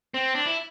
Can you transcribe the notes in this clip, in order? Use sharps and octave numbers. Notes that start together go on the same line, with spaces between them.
C4
D4
E4